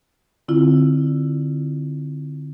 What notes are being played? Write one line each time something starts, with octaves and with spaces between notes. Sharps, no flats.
D3 C4 E4 F4